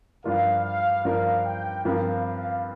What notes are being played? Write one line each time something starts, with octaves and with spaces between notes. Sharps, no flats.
G2 F3 D4 F4 A#4 F5
F5
G2 F3 D4 F4 A#4 F5
G5
G2 F3 C4 A#4 F5
F5